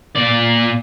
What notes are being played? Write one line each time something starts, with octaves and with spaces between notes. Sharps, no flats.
A#2 D5